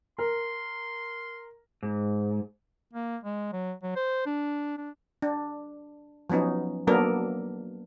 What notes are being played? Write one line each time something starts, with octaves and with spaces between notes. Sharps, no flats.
A#4 C6
G#2
A#3
G#3
F#3
F#3
C5
D4
D4
D4
F3 F#3 B3 C#4 D#4
F#3 A#3 B3 D4 A4 A#4